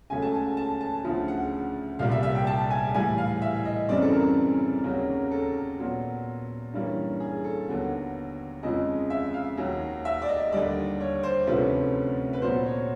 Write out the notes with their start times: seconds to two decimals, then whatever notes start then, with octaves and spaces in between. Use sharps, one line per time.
0.10 C#2 C#3 F#3 A3 G#5
0.22 A5
0.34 G#5
0.57 A5
0.81 A5
1.04 D2 C#3 F3
1.28 F#5
1.99 C2 A#2 G3 F5
2.11 E5
2.23 E5
2.35 G5
2.47 A5
2.70 G#5
2.94 A2 E3 G3 G#5
3.18 F5
3.42 E5
3.65 D#5
3.89 F#2 C#3 E3 G3 C4 D5
4.02 A4
4.13 A#4
4.84 D#2 C#3 F#3 A#3 C#4
5.31 A4
5.79 A#2 F#3 B3
6.73 G2 E3 G3 A#3 C#4
7.20 G#4
7.44 A4
7.68 D#2 D3 F#3 B3
8.63 F2 C#3 F3 G#3 D#5
9.10 E5
9.34 F5
9.57 D#2 D#3 F#3
10.05 E5
10.22 D5
10.29 D#5
10.52 D#2 D3 G3 D5
11.00 C#5
11.23 C5
11.47 D2 C3 F3 A3 C#4 B4
12.33 B4
12.42 A#2 F#3 B3 C5
12.66 C#5